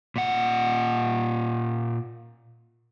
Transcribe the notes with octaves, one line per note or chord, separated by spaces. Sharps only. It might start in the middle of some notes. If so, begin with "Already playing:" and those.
A#2 F#5